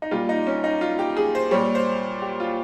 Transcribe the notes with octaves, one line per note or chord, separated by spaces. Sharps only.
D#4
A#2 G3 F4
D#4
C#4
D#4
F4
G4
G#4
C5
A#2 G3 C#5
C5
G4
F4